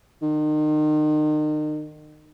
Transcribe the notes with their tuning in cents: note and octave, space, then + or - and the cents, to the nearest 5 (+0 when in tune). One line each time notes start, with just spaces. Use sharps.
D#3 -35